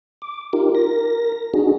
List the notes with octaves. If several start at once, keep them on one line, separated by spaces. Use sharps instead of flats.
D6
D#4 F4 G4 A#4
A#4 A#6
D4 D#4 F#4 G#4